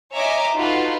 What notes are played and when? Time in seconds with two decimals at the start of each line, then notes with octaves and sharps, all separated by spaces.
0.14 C#5 D#5 E5 G#5 A#5 D6
0.55 D#4 F4 F#4 A4 B4